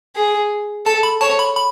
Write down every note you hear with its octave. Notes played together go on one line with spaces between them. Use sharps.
G#4
A4 A5
B5
C#5 A5
B5
B5